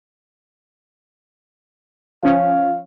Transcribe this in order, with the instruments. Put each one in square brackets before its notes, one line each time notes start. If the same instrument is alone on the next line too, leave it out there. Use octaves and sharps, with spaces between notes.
[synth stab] F3 C#4 [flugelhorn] F5